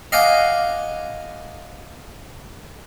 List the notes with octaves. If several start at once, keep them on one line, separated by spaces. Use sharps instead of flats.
D#5 F5 F#5 G#5 D6